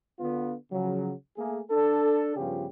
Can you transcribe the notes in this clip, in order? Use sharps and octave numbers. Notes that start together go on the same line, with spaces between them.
D3 B3 F4
C#3 F3 F#3
A3 A#3 G#4
D4 A4
G2 C#3 F3 B3 F4 G4